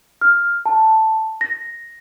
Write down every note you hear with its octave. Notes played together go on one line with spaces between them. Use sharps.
F6
A5
A#6